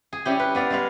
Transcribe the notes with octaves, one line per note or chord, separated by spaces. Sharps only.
G#4
G3 C#4 E4 G4
B4
B3 D5 F5
G3 G#3 F5